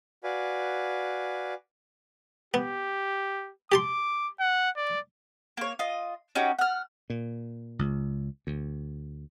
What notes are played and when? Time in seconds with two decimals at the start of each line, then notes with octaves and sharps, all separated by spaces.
0.24 F#4 B4 D5 F5 G#5
2.54 B3 G4
3.72 G4 A5 C6 D6
4.40 F#5
4.77 D5
5.57 A#3 C#5
5.79 F4 D#5
6.35 C#4 D#4 F#4 G4
6.59 F#5 F6
7.10 A#2
7.79 C#2
8.47 D2